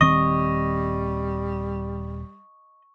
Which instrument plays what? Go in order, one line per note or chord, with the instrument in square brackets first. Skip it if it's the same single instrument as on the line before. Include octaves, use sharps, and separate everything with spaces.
[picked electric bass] D#1 D#3 C4 [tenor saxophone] G3 [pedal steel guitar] D#5 [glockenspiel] C#6